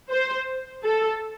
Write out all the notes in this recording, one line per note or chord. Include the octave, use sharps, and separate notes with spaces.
C5
A4